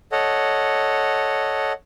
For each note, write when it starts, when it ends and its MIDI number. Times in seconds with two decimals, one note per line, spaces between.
0.12 1.72 69
0.12 1.72 73
0.12 1.72 75
0.12 1.72 78